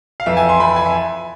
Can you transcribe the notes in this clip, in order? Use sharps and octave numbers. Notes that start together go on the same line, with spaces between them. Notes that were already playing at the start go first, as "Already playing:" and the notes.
F5
F2 E3 E5
G#5
C6
F2 E3 B5
G#5
E5